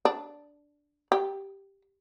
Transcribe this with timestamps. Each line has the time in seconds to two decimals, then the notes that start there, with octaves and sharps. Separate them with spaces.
0.05 D4
1.12 G4